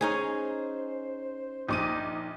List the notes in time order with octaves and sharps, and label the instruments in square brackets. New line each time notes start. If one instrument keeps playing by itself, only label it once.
[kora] C#4 D#4 G#4 [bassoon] C5
[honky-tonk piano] A#1 D6 D#7 [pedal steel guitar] D#4